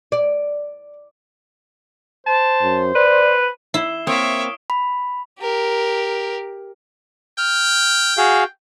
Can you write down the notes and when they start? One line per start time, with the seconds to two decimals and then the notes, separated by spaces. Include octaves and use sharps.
0.12 D5
2.27 C5 A5
2.62 F#2
2.95 B4 D5
3.74 E4 C7 E7 G7
4.07 A#3 C4 C#5 E5 F5 D#6 D7
4.70 B5
5.39 G4 A#4
7.38 G5 F6
8.17 F#4 G#4 F5